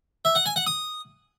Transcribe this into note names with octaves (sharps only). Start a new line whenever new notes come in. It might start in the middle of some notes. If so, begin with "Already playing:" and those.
E5
F#5
G#5
F#5
D#6